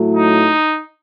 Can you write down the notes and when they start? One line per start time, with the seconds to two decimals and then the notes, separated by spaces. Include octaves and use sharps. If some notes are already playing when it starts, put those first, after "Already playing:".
Already playing: A2 F#3 A3
0.16 D#4